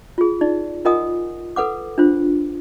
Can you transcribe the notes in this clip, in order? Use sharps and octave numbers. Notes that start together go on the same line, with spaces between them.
F4 G#4
D#4 D5
F4 A#4 D#5 F#5 G#5 D#6
A4 B4 F#5 D6
D4 F4 C5